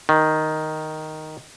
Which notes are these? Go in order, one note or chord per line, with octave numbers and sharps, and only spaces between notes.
D#3